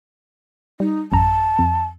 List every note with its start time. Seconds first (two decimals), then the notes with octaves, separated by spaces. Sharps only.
0.80 G3 D#4
1.12 A1 F#2 A5 A#5
1.59 F2